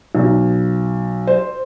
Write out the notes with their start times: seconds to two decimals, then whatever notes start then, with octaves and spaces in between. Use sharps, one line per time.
0.15 B1
1.27 C5